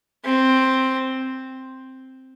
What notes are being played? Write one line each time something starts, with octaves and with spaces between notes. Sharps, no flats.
C4